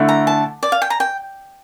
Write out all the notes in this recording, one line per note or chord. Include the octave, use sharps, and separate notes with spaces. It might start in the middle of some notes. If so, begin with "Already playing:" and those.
Already playing: D3 A3 E4
A#5
A5
D5
F5
G5
A#5
G5